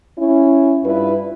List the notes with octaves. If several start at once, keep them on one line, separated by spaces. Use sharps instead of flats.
C#4 E4
G2 E4 F4 B4